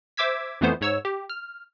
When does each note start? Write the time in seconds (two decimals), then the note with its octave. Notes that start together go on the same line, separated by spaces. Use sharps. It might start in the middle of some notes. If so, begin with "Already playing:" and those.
0.17 C5 E5 D6 E6 G#6 B6
0.61 F2 E3 A3 B3 C5
0.81 G#2 C#5 E6
1.05 G4
1.29 F6